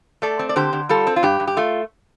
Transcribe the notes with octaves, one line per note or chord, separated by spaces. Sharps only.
A3 A4 D5
C4
D5
D3 G4 C5
D3
G3 F4 A4
C4
F4
G2 G4
G2
G4
A3 F4